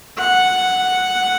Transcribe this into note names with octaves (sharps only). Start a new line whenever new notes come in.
F#5